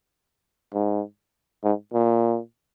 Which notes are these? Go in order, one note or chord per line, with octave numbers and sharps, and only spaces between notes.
G#2
G#2
A#2